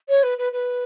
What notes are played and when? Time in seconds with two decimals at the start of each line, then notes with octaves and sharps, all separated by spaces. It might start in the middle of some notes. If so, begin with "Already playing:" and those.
0.09 C#5
0.23 B4
0.38 B4
0.52 B4